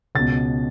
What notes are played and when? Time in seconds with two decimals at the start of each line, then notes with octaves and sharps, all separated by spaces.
0.15 C#2 B2 A6